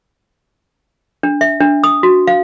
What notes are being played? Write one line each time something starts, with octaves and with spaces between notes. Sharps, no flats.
D4
E5
D4
D#6
F#4
F5